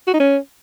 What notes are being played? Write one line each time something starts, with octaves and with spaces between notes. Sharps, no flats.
F#4
D#4
C#4